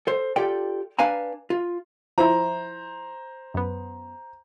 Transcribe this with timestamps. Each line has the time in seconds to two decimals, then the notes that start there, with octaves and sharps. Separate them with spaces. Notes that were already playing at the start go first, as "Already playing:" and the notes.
0.07 A4 C5
0.36 F4 G4 A4 D5 G5
0.99 D4 B4 F5 G#5 A#5
1.50 F4
2.18 F3 E4 C5 A#5
3.54 F#2 B3